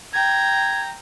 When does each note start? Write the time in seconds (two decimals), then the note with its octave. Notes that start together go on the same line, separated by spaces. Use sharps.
0.13 G5 A#5 G#6